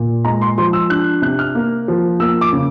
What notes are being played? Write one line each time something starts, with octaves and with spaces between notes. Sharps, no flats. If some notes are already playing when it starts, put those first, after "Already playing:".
Already playing: A#2
G#3 A#5
C6
F3 C6
E6
D4 F#6
C3 F#6
F6
A#3
F3
A#3 E6
D6
C#3